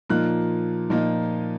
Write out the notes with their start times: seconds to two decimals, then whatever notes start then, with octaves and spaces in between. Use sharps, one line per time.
0.10 A#2 F3 A#3 D#4 F#6
0.90 A#2 F3 A#3 D#4